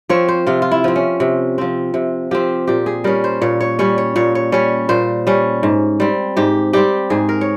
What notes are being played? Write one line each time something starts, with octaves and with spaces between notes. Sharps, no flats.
F3 C4 C#5
C5
C3 F4
F4
E4
F3 C4
C#4
C3
F3 C4
C3
F3 C4 G4
A#2 G4
G#4
G3 C#4 A#4
C5
A#2 C#5
C#5
G3 C#4 C#5
C#5
A#2 C#5
C#5
G3 C#4 C#5
A#2 C5
G3 C#4
G#2
G3 C4
G#2 G4
G3 C4 G4
G#2 G#4
A#4
C#5